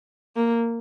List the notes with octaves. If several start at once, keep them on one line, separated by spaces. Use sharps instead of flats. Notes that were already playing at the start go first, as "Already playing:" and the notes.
A#3